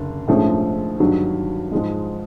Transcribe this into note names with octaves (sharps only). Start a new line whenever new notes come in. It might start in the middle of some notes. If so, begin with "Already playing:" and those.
Already playing: F#1 D3
A#1 G#2 F3 A3 C#4
G2 D#3 F#3
G#2 F3 G#3